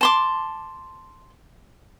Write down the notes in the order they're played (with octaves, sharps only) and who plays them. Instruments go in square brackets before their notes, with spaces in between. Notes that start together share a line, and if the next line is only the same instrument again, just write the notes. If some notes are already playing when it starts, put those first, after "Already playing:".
[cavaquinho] A5 C6 D6